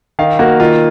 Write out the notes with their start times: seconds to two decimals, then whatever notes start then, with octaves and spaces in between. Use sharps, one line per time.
0.19 D#3 F5
0.39 A#3 F#4
0.60 D#3 F4